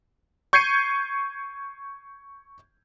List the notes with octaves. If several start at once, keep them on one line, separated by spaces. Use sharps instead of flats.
C#6 G6 G#6 C7 C#7 D#7